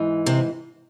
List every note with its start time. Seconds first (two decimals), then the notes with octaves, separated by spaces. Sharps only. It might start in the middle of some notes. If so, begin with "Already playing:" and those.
Already playing: G#2 E3
0.26 C3 C4